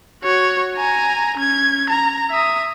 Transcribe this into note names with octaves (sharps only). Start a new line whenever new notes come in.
F#4 C#5
G#5 A#5
C#4 G#6
A#5
E5 D#6